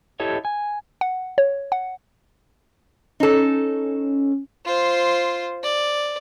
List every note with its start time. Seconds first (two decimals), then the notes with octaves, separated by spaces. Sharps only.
0.20 E4 G4 A4 C#5 D#5
0.45 G#5
1.01 F#5
1.38 C#5
1.72 F#5
3.20 C#4 D#4 A4
4.65 F4 C5
5.64 D5